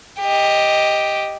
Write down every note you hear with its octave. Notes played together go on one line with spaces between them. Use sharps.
G4 D#5